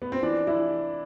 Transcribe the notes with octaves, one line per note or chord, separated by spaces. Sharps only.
B3
C4
E3 D4
E3 E4